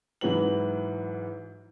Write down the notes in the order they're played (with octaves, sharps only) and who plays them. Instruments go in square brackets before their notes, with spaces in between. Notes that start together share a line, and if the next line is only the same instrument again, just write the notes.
[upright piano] G#2 E3 F#3 B4 F#7